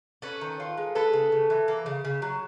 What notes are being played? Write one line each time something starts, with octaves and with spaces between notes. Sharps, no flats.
C#4 A4 B4
D#3
F4
G#3
G#3 A4 B4
C#3
C#3
E3
A#3
C#3
C#3
F#3